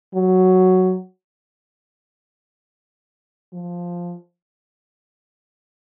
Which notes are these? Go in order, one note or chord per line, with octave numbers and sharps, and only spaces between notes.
F#3
F3